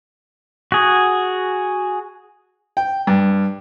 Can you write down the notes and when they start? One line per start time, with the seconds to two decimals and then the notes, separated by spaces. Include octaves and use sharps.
0.72 F#4 G#4
2.77 G5
3.07 G2